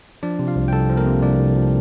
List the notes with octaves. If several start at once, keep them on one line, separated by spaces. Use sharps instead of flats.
F3 D4 D5
C3
F4 F5
C2
G5
C2 A4 A5
F3
A#3 A#4
C3
C2 D4 D5
C2
F3